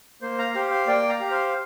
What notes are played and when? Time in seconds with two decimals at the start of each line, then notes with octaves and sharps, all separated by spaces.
0.22 A#3 C5
0.39 F5 A#5
0.54 G4 C5 F5
0.70 C5 F5
0.87 A#3 D5 G5
1.09 F5 A#5
1.20 G4
1.31 C5 F5